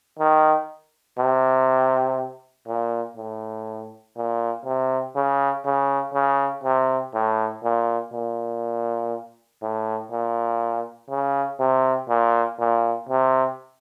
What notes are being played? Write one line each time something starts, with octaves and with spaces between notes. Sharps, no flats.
D#3
C3
A#2
A2
A#2
C3
C#3
C#3
C#3
C3
A2
A#2
A#2
A2
A#2
C#3
C3
A#2
A#2
C3